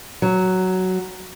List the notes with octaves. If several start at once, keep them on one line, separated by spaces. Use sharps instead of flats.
F#3